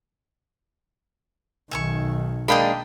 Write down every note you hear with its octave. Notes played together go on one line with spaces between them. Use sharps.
B1 D#3 E5 G#5 C#6
G#3 A#3 D4 D#5 G5 B5